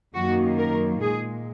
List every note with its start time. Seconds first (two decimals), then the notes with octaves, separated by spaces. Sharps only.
0.14 F#2 D#3 A#3 F#4
0.58 A#4
1.01 A#2 G#3 G#4